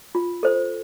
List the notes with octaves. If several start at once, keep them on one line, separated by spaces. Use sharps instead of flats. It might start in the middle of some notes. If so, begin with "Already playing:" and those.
F4
A4 C5